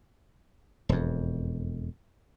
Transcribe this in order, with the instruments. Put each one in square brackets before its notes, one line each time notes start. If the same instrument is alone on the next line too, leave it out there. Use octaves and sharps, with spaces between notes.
[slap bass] E1 F2